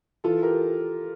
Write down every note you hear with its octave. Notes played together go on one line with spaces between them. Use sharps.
E3 F4 A4
G4 A#4